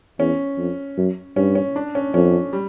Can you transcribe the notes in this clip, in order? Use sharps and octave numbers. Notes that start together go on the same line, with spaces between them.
E2 C#4
F2
F#2
G2 C#4
C#4
D4
C#4
F2 C#4
G3